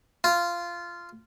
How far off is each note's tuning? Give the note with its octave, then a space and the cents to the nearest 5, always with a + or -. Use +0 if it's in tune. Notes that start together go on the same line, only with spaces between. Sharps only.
F4 -10